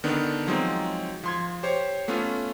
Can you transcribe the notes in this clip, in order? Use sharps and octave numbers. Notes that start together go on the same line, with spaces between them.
D3 D#3 B3 D4
F3 F#3 G#3 C4 D#4
F3 C6 G#6
G4 C5 C#5
A3 B3 C#4 F4